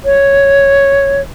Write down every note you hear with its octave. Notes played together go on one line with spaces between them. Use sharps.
C#5